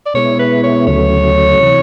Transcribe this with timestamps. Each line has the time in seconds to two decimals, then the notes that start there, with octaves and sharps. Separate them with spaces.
0.06 D5
0.14 B2 G#3 B3 E4 C#5
0.39 B4
0.63 C#5
0.86 D2 C#3 F#3 A3 C#5
1.60 C3 E3